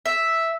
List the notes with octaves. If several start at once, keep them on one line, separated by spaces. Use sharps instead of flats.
E5